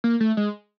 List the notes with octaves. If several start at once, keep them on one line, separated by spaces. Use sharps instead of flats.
A#3
A3
G#3